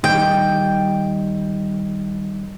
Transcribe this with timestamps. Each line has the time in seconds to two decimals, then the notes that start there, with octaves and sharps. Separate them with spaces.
0.04 D#3 G3 G5